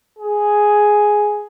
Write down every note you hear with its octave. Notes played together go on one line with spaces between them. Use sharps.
G#4